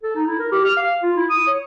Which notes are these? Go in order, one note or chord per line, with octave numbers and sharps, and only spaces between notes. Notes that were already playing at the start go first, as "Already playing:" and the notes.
A4
D#4
E4
A#4
G4
F6
F5
F4
E4
D#6
C#5